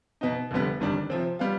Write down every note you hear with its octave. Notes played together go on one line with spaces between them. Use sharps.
B2 B3 D#4
F1 F2 D3 G3 B3
G1 F2 D#3 G3 D4
C3 F3 C4
G3 B3 F4